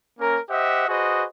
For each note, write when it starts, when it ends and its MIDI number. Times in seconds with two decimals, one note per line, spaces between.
0.19 0.38 58
0.19 0.38 61
0.19 0.38 70
0.49 0.86 67
0.49 0.86 72
0.49 0.86 75
0.49 0.86 76
0.49 0.86 78
0.88 1.24 66
0.88 1.24 68
0.88 1.24 71
0.88 1.24 72
0.88 1.24 75